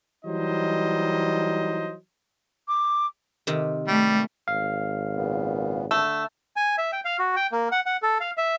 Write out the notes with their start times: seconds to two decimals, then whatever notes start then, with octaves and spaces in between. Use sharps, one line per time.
0.25 E3 F#3 G3 D#4 C5 D#5
2.68 D6
3.47 C3 D#3
3.88 G3 A3
4.48 G#1 F5
5.16 A#2 C#3 B3
5.91 D3 A3 E6
6.56 G#5
6.78 E5
6.92 G5
7.05 F5
7.19 F#4
7.36 G5
7.52 A#3
7.72 F#5
7.86 F#5
8.03 A4
8.21 F5
8.37 E5